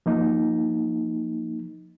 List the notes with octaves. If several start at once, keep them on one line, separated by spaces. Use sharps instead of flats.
F3 A#3 D#4